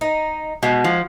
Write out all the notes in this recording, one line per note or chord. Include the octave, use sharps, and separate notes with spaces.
D#4
B2 G#3
F3